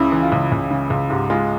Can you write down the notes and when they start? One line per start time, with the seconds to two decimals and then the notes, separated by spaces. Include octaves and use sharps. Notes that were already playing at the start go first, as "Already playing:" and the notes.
Already playing: C#2 C#3 E4
0.12 E3
0.23 F4
0.32 C#2
0.52 C#2
0.71 C#3
0.90 C#2
1.10 G#2 G4
1.30 G#3 F4